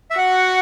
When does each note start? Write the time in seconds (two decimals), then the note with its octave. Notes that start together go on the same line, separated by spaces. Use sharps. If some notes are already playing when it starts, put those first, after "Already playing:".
0.10 E5
0.18 F#4 F#5